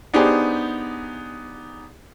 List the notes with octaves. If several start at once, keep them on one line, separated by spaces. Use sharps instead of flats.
B3 D4 D#4 G4 G#4 C5